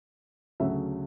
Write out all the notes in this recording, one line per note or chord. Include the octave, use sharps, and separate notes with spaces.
D2 C#3 F#3 A3 E5